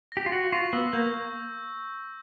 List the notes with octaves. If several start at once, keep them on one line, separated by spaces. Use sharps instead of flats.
G4 A#6
F4
F#4 A#6
F4 C#6
B3 E6
A#3 G6